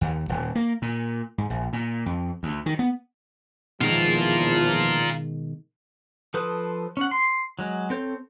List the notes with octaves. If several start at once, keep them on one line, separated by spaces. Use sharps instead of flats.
D#2
D#1
A#3
A#2
G#2
A#1
A#2
F2
D2
D#3
B3
E2 B2 D#3 F3 G#3 F4 A#4
F3 A4 B4 C5 D#6
C#4 F#5
C6
F#3 G#3
C4 A4 C#5 G6